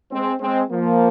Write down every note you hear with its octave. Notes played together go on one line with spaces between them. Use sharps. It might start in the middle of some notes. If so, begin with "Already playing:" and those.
G#3 C4
G#3 C4
F3 A#3